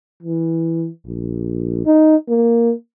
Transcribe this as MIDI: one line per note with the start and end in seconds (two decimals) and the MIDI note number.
0.23 0.88 52
1.07 1.81 34
1.86 2.16 63
2.29 2.72 58